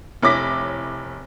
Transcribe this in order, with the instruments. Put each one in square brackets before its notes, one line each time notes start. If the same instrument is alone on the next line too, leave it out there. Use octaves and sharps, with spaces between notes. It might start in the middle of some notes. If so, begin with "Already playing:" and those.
[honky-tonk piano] F1 E4 C#5 D6 A#6 B6